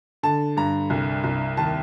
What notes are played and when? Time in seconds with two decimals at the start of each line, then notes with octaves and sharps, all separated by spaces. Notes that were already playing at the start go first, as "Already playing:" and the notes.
0.23 D3 A5
0.57 G2 A#5
0.90 C2
1.24 C2
1.57 D#2 A5